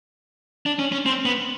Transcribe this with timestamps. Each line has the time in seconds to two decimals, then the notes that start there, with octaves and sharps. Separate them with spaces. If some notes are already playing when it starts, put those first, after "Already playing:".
0.66 D4
0.79 C#4
0.92 C#4
1.06 C4
1.25 B3